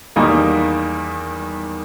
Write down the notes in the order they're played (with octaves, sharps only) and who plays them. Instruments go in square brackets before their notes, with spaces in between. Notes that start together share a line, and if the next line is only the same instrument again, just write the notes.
[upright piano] E2 D#3 G3 A#3 D#4